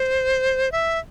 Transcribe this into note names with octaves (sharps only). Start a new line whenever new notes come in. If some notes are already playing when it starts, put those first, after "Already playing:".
Already playing: C5
E5